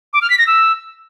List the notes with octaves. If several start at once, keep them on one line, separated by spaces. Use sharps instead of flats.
D6
F6
B6
A#6
E6